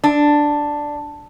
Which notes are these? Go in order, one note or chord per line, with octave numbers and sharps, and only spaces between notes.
D4